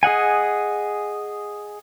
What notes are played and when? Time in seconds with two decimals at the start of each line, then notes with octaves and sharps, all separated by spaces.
0.03 G#4 D#5 F#5 G#5